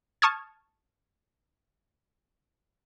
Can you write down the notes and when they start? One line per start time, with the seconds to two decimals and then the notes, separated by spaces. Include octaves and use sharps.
0.22 A5 C#6 D#6 F6 G#6